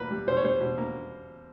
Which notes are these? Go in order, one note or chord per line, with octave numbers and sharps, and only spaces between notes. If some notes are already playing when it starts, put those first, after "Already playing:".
Already playing: B2 A#3 B4
G3
B2 C5
C#5
G3 C5
B2
A#3